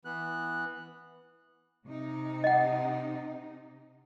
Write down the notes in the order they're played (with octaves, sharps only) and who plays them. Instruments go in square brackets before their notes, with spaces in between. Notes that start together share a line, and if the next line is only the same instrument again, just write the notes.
[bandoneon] E3 B3 F#6
[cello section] C3 D#4
[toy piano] D#5 F#5